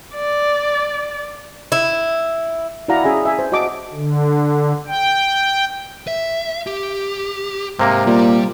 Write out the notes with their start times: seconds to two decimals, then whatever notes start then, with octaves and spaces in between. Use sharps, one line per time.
0.14 D5
1.72 E4
2.88 E4 F#4 D5 F5 F#5 A#5
3.03 C#4 G#4 E5 G#5 A#5
3.25 E5 G#5
3.39 C5
3.52 F#4 D#5 A5 D6
3.93 D3
4.87 G5
6.07 E5
6.67 G4
7.79 G#2 C3 A#3
8.07 A#2 G3